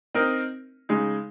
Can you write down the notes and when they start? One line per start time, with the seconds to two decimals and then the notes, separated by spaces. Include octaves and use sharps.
0.15 C4 D#4 A#4 D#5
0.89 C#3 G#3 D#4